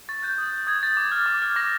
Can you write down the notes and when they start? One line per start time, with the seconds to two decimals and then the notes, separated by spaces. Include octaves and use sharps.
0.09 C#6 A6
0.22 F#6 G6
0.38 D#6
0.53 G6
0.67 D#6 G#6
0.83 G6 A6
0.97 D6
1.12 F6
1.26 D6
1.42 F6
1.56 D6 A#6